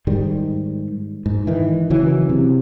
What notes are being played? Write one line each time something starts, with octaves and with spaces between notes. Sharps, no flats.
G#2 D#3 G3
G#2
D#3 E3
C#3 E3 F#3
C3